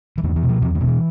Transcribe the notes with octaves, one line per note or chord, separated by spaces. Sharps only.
E3
E2 D3
E3
B2
F3
E2 F3
D3
B2
E3